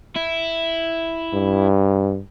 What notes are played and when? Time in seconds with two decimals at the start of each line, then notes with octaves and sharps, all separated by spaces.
0.16 E4
1.33 G2